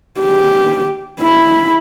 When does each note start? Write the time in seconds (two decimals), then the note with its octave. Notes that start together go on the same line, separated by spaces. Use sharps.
0.20 G4
1.20 E4 B5